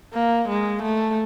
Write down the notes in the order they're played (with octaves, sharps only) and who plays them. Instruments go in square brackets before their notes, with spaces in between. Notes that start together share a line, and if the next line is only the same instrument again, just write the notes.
[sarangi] A#3
G#3
A3